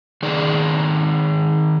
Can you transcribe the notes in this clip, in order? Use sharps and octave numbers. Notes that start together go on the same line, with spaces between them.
D#3 D#4 G#4 D5